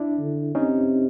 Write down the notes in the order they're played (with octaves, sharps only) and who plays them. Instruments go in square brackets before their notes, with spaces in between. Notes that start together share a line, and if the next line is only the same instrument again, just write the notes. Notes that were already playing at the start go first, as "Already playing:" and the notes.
Already playing: [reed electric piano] D4 E4
[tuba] D3
[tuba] C3 [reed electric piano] C#4 D#4